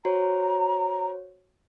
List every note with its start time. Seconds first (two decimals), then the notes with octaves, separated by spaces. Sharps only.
0.05 F#4 C5 C#5 A#5